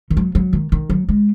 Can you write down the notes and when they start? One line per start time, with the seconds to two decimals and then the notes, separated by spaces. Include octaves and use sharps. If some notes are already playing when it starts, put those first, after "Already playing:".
0.10 D#3
0.17 F#3
0.35 F#3
0.53 D#3
0.72 D#3
0.90 F#3
1.08 G#3